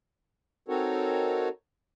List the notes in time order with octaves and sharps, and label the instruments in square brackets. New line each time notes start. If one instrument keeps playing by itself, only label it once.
[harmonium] C4 D#4 F#4 A4 A#4 C#5